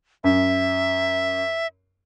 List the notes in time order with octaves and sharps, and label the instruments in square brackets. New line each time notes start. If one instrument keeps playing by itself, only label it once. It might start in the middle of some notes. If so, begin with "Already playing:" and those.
[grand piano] F#2 [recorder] E5